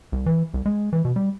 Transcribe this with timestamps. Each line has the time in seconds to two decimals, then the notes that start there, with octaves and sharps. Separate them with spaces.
0.12 C2
0.26 E3
0.54 C2
0.66 G#3
0.93 E3
1.05 B2
1.16 G3